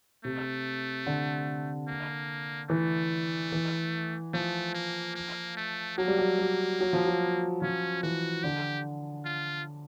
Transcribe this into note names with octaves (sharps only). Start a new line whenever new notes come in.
C3 A3
D3
A#3
E3 A3
E3
F3 A3
A#3
A#3
A3
F#3 A#3
G3
F#3
G3
F#3
F3
F#3
F3 C#4
E3 F#4
D3 G4
F4